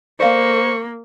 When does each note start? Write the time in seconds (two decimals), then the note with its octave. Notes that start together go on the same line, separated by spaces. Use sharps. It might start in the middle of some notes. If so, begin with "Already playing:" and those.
0.20 A#3 C5 D5 F5 C#6